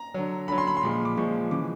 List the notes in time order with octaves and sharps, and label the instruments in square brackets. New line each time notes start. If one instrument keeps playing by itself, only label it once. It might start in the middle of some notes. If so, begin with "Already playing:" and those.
Already playing: [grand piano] A#5
D3 F#3
D3 F#3 B5
C6
B5
C6
A#2 F3 G#3 B5
D6
A#2 F3 G#3 C#6
C#3 E3 G#3 D6